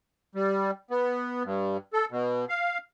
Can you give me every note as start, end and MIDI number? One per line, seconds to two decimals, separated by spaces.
0.35 0.71 55
0.91 1.43 59
1.44 1.77 43
1.93 2.05 69
2.11 2.45 47
2.49 2.78 77